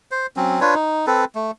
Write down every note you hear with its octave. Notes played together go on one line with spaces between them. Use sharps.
C5
F#3 C4 C#4
D4 F4 B4 C#5
D#4
C4 A4 B4
A3